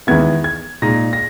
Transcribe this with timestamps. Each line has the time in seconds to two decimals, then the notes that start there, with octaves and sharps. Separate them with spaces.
0.07 E2 D#3 G#3 B3 E4 G#6
0.44 G#6
0.82 A#2 G#3 D#4 A#6
1.13 A#6